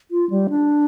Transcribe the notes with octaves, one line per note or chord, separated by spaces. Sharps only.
F4
G3
D4